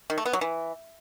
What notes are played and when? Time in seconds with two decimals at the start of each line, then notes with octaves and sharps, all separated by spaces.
0.10 D#3
0.18 A3
0.25 B3
0.33 F#3
0.41 E3